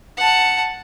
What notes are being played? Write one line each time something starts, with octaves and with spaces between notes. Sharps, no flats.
F#5 A5